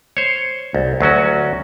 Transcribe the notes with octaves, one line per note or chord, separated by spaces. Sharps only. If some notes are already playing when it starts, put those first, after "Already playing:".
C5 C#5
C2
D2 F#3 C#4 F#4